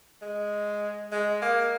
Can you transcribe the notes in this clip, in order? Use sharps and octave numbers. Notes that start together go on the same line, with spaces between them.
G#3
G#3
A#3